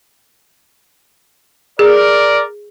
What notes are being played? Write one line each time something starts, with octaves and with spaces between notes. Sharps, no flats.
G#4 A#4 D5